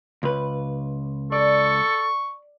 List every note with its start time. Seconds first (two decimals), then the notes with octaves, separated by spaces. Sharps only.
0.23 C#2 B4
1.32 A4 D5 C#6